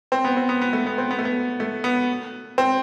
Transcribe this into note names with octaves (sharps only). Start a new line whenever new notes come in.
C4
B3
C4
B3
B3
A3
B3
C4
B3
A3
B3
A3
B3
C4